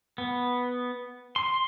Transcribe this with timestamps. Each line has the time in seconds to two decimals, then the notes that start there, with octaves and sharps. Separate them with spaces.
0.18 B3
1.36 C6